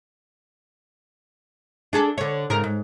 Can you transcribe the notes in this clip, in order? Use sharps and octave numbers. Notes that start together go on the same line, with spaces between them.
D4 G#4 A4
D3 C#5
G#2 C#3 A#4
G#2